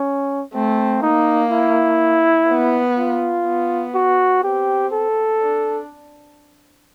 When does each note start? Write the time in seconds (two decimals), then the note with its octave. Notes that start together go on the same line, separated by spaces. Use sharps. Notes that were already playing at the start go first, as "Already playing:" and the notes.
Already playing: C#4
0.54 A3 C4
1.02 A#3 D#4
1.51 E4
2.48 B3
2.98 F4
3.46 B3
3.94 F#4
4.43 C4 G4
4.93 A4
5.42 D4